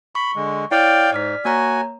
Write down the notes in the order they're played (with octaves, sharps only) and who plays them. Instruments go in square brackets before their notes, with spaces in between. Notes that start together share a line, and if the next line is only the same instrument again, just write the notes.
[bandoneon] B5 [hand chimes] C#6
[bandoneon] D3 G#3
[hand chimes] E4 C#5 [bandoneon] D5 F5 G5
[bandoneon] G#2 [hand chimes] D5 F6 B6
[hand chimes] A#3 C#5 A#5 [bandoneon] F#4 G#5